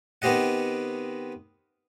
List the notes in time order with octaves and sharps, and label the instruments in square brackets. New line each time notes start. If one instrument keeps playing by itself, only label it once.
[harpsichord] D#3 B3 C4 G4 D#5 F#5